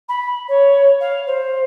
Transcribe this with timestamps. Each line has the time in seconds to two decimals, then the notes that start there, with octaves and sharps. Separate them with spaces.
0.08 B5
0.48 C#5
1.00 F5
1.26 C5